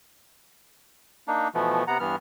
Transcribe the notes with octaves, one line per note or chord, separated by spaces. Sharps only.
A#3 D4 D#4
B2 E3 F3 A3 B3
C3 B3 F#5 A#5
G2 E3 B3 F6